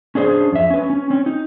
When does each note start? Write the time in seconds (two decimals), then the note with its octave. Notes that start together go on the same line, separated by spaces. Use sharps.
0.15 C#4 D4 G#4 C5
0.52 F2 E5
0.70 C#4 B4
0.90 C#4
1.10 C4 C#4
1.26 D#4